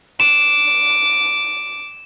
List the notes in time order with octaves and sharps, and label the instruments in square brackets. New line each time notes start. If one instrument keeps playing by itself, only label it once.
[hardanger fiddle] D6 [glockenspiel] E7